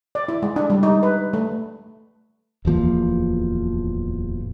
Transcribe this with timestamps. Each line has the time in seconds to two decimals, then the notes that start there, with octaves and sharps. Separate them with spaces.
0.15 D5
0.28 E4
0.42 G#3
0.56 D4
0.70 G3
0.83 D#4
1.03 B4
1.33 A3
2.65 D1 E2 F3 A#3